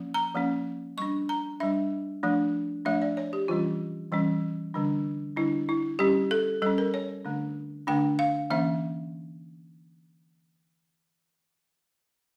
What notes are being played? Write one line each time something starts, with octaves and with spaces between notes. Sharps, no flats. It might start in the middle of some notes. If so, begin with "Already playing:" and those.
Already playing: F3 A#3 C#4
A#5
F3 A#3 C#4
G3 D4 C#6
A#5
G3 D4 E5
F3 A3 D4
F3 A3 D4 E5
D5
C#5
G4
E3 G3 C#4 F4
E3 G3 C#4
D3 G3 D4
D3 G3 D4 E4
E4
G3 C#4 G4
A4
G3 C#4 A4
A#4
C#5
D3 A3 D4
D3 A3 D4 G5
F5
E3 A#3 C#4 E5